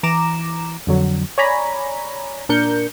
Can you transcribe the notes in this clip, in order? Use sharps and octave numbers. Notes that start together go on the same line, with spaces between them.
E3 A#5 D6 E7
F2 D3 F#3
C#5 D5 G#5 A#5 B5
A#2 D4 A#4 G6 C#7